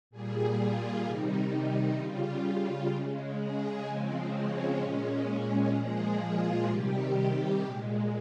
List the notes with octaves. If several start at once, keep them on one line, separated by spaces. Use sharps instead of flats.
A#2 G3 G#4
F4
C3 D#3 G3 D#4
C#3 G3 F4
C#3 G#3
G#4
C#3 F3 G#3 C4
C#4
A#2 G#3
A#2 F3 G#3 G#4
F4
C3 D#3 G3 G4
A#2 G#3